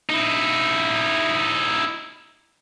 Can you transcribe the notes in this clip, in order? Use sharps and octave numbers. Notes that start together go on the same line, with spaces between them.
D#4 E4